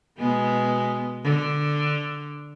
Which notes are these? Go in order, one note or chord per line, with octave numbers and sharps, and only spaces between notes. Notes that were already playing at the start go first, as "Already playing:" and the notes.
B2 G#3 B3
D3